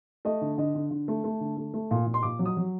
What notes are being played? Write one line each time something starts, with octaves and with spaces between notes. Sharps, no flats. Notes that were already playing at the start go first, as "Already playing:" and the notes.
A3 D#5
D3
D3 D#5
D3
D3
A3
A3
D3
A3
A3
A#2
A#2
C6
A#2 D6
F#3
D#6
F#3